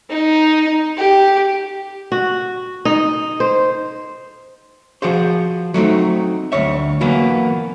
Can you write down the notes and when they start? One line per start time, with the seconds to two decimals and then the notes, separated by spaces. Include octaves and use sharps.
0.10 D#4
0.97 G4
2.12 F#4
2.85 D#4
3.40 C5
5.02 F3 F#4 G#4 C5
5.74 F#3 A3 C4 D#4
6.52 D2 G2 C#5 E5
7.01 E3 F#3 A#3 B3